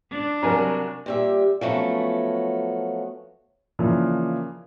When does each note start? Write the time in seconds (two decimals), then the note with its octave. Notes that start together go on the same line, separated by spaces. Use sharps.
0.11 D4
0.43 C3 F#3 G3 A#4 G#5 A#5
1.06 A#2 G3 E5
1.61 F3 F#3 A3 B3 C#4
3.79 C#3 E3 F3 A#3 D4